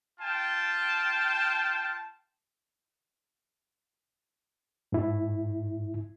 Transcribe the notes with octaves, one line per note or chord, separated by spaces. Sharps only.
F4 G5 A5
G#2 E4